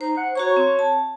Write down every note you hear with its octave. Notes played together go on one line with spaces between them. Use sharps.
D#4 C5
F#5
F#4 C#5 A#5 C#6
C4
A5